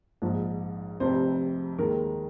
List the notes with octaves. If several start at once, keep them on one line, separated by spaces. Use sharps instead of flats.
A#1 G#2 F3
F1 F2 C3 C5
D#2 D#3 G#3 A#4